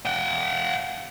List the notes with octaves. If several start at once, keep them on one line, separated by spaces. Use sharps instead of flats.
F#5 G5